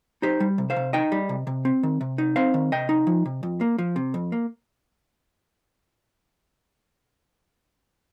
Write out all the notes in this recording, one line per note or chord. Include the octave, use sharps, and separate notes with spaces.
D#4 G4 C5
G3
C3
C5 F5
C3
D#4 D#5 G5
G3
C3
C3
C4
D#3
C3
D#4
C4 C5 F5
D#3
C3 D#5 G5
D#4
F3
C3
F2
A#3
F3
C3
F2
A#3